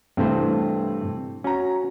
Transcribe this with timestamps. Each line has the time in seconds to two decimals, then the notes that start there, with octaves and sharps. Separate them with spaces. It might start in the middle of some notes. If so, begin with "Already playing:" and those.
0.17 G2 C3 E3 A3 C4 C5
1.44 C#4 F#4 A#5